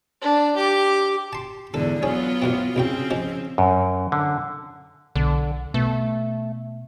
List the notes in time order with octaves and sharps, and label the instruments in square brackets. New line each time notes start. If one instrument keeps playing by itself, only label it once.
[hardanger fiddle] D4
G4 D6
[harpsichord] A5 C6
[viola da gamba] E2 G#2 D3 [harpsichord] A4
[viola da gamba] F#3 B3 F4 [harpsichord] G#4 C#5
[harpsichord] A1 F#2 C4
[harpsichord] C2 F#2 G5 [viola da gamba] C#3 C4
[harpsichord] F3 G#3
[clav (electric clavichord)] F#2
D3
[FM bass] B1 [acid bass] D3
[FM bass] B2 [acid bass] A3